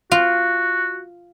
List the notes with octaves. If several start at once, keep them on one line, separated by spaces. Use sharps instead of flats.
F4 F#4